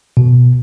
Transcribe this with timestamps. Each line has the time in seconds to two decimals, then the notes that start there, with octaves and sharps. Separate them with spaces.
0.17 B2